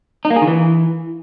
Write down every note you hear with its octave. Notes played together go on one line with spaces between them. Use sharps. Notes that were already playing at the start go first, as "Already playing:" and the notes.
D#4
A#3
G#4
D#3
E3